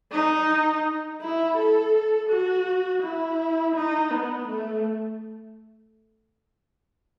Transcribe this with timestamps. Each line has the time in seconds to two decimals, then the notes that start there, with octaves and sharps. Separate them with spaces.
0.12 D#4
1.21 E4
1.57 A4
2.30 F#4
3.02 E4
3.75 D#4
4.11 B3
4.48 A3